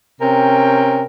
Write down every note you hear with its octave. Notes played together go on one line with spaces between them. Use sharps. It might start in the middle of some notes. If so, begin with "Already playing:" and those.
C3 C#4 A#4 G5